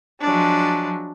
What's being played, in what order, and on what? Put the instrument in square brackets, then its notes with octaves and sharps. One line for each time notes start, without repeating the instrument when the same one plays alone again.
[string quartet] F3 F#3 G#3 D4